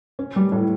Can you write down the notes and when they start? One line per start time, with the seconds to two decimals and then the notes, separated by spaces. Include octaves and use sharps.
0.19 C#4
0.36 G3
0.52 A2